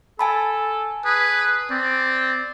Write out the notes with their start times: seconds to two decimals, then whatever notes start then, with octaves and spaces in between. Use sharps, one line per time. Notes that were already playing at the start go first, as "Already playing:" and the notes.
0.19 A4 G#5 A5 B5
1.05 G#4 B4
1.71 C4 D5